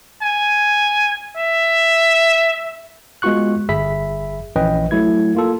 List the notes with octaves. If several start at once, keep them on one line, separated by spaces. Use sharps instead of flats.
G#5
E5
G#3 B3 F4 F#4 C#6 F#6
G1 G#4 E5 B5 B6
A#1 E3 C#4 B4 D#5 G5
F#3 A3 E4 G#6
A#3 F4 A4